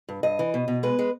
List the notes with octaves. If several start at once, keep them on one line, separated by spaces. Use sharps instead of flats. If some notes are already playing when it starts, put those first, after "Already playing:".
G2
G2 D#5
E3
B2
B2
G#3 B4
G#3